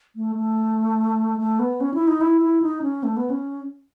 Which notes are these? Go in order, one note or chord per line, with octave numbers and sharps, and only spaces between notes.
A3
A3
A3
B3
C#4
E4
D#4
E4
E4
D#4
C#4
A3
B3
C#4